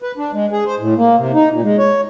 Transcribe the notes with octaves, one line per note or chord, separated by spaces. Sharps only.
B4
D4
G#3
G#4
C5
A2
A#3
C3
D#4
A#2
G#3
C#5